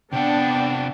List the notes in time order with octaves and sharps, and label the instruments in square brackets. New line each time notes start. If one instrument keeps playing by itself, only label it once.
[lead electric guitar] C3 F#5 [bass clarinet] B3 [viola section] D4 [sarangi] G5